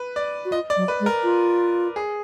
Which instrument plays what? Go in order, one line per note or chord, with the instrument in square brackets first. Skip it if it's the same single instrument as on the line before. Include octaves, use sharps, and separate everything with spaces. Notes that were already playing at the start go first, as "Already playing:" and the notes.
Already playing: [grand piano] B4
D5
[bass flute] F#4
[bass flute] F4 [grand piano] D#5
[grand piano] D5
[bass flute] F#3
[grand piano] B4
[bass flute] G#3
[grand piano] A#4
[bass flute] F4
[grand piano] G#4